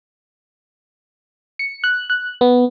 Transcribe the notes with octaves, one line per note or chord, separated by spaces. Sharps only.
C#7
F#6
F#6
B3